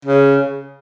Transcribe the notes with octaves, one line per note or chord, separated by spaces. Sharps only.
C#3